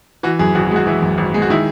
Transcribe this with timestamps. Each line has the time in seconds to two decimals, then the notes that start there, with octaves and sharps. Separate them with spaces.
0.23 E3 F#4
0.39 F#2 G#4
0.55 G#1 F#4
0.71 G#3 F#4
0.87 E3 E4
1.02 F#2
1.18 G#1
1.34 G#3
1.42 F#4
1.50 D#3 E4